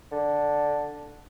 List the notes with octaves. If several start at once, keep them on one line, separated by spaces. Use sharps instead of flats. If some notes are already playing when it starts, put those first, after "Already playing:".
D3